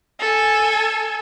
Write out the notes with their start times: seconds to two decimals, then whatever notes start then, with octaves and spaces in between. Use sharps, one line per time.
0.19 A4 G#5